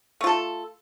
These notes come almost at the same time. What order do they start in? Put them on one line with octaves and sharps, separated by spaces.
A3 F4 A4